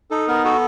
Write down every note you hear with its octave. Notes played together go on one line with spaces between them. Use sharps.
D#4 A4
B3 A#4
F#4 A4